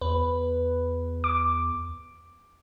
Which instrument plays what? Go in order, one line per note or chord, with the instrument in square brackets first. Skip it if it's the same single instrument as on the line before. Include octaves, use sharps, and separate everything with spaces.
[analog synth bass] E2 [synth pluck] B4
[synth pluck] D6